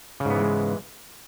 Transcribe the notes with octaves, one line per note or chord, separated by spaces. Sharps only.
G#2 C#3 E3 G#3 B3